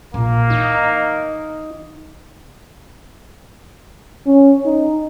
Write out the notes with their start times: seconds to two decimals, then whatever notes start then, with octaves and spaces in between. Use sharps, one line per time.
0.14 A#1 A#3
0.50 E3 D#4
4.26 C#4
4.65 D#4